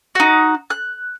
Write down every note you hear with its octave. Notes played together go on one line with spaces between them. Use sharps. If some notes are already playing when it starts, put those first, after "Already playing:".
D#4 F#4
F#6